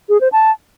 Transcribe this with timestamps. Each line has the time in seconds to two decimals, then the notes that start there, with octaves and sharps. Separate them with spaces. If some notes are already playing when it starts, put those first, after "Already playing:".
0.09 G#4
0.21 C5
0.32 A5